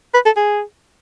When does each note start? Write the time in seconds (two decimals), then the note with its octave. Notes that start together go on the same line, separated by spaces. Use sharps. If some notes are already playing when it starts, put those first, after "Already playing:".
0.14 B4
0.26 A4
0.37 G#4